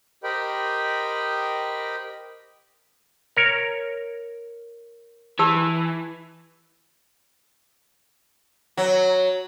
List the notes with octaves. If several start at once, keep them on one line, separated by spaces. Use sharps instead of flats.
G4 A#4 C5 D#5 G5 B5
A#4 C#5
E3 G4 A5 E6
F#3